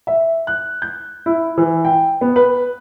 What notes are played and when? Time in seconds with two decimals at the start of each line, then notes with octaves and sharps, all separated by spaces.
0.07 E5
0.47 F#6
0.82 G6
1.26 E4
1.58 E3
1.85 G5
2.21 B3
2.36 B4